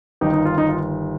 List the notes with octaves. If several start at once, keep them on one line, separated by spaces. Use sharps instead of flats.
G1 G2 D#3 D#4 G4
D#4
F4
D#4
F4